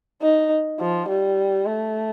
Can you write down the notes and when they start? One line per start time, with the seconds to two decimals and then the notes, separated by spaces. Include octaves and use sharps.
0.22 D#4
0.80 F3
1.09 G3
1.66 A3